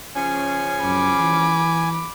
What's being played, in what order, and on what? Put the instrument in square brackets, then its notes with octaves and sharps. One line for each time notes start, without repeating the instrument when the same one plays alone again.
[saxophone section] C#3 F3 C#4 [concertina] G#5
[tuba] F#2 [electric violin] B5 D6
[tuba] E3